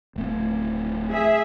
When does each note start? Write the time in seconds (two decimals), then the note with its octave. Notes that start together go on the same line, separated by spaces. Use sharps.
0.16 D1 A3 C4
1.09 G#4 E5